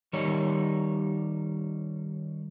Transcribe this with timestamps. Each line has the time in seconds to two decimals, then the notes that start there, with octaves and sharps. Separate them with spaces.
0.13 D#3 G3 D#4 C#5